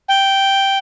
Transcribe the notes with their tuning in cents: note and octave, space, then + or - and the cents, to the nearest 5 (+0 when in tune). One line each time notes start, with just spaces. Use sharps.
G5 -5